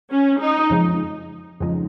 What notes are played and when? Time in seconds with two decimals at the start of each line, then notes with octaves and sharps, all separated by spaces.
0.11 C#4
0.41 D#4
0.70 F2 C#3 F3 G#3 D#4
1.60 F2 C#3 F3 G#3 D#4